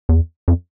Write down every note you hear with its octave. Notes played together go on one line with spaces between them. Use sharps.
E2
F2